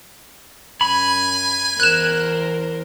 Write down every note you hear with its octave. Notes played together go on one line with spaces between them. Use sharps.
F#2 G#5 B5
E2 A#4 C5 F#6 E7